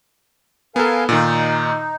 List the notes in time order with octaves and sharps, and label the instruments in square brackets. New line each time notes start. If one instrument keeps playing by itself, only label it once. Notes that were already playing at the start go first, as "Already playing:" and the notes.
[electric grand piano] B3 A4 [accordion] A#4 F5 G#5
[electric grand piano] A#2 D#3 [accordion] D#4